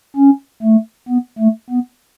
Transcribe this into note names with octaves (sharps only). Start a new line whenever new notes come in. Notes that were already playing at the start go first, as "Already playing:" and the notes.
C#4
A3
B3
A3
B3